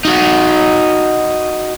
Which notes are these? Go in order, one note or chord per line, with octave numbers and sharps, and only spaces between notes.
D#4 F#4